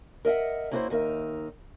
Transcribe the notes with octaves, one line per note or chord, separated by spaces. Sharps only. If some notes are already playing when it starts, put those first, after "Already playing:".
A#4 D#5 E5 F#5
A#3 C#4 E4 F#4 A4 C5
D#2 D#4 A#4 E5